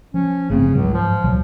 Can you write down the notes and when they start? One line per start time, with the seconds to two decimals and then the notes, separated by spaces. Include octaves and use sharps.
0.14 F3 C#4
0.50 G1 C#3 A3 C4
0.75 C#2 G#2 F#3
0.94 F3
1.24 D2 B2 F#3